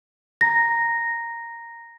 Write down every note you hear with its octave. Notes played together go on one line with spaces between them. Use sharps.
A#5 A#6